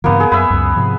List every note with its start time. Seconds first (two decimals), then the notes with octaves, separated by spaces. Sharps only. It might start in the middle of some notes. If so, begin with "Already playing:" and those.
0.04 G2 C#3 E3 A#3 B3
0.20 G#4
0.32 F#2 B4 E5
0.50 C#2 F#2
0.76 G#2 C3 F3